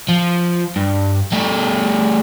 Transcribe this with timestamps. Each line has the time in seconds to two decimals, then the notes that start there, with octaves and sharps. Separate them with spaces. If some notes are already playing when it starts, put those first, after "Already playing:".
0.09 F3
0.76 G2
1.32 G3 A3